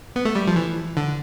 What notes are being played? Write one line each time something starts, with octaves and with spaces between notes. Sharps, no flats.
B3
A3
G3
F3
E3
D3